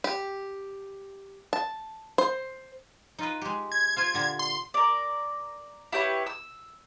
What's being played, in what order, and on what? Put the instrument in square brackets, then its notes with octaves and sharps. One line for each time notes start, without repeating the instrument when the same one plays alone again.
[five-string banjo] G4
A5
C5
[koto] D#4 F4 B4
G#3 G4
[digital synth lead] G#6
[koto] F4 C5 F5
A#2 D3 G4
[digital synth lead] C6
[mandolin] A#4 D5
E4 G4 B4 C#5
E6